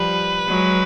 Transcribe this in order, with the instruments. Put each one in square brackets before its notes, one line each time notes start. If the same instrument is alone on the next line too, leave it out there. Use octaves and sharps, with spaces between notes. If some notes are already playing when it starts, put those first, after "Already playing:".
Already playing: [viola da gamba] F3 G3 [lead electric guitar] B4
[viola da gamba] F#3 G#3